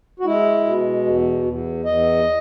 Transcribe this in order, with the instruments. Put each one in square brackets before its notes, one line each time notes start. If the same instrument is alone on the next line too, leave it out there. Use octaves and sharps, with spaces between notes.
[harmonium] F#4
G#3 E4
B2
E2
E2
E2 D#5